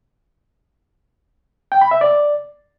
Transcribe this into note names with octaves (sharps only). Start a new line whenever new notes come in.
G5
B5
E5
D5